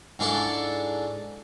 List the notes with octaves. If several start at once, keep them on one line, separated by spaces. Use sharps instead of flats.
G#2 G#3 D4 E4 A4 C#6